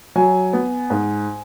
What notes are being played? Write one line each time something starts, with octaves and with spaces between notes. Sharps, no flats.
F#3 G#5
B3
G#2